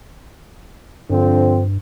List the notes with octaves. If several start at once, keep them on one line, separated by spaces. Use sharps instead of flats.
G2 D3 F3 C4